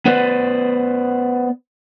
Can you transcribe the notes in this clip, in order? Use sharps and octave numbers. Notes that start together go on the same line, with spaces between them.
B3 B4 C5 D5